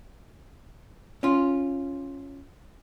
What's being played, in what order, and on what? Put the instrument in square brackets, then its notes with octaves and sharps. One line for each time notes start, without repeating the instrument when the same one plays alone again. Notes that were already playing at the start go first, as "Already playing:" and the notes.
[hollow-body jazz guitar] C#4 F4